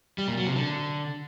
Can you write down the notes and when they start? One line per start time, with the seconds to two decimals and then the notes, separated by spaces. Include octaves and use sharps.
0.18 G3
0.28 A#2
0.37 F#3
0.47 C3
0.56 D3